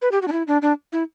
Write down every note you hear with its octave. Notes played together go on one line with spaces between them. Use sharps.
B4
G4
F#4
D4
E4
D4
D4
E4